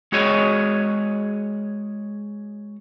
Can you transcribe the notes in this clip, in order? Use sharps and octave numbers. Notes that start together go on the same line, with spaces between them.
G#3 F#4 G#4 C#5 D#5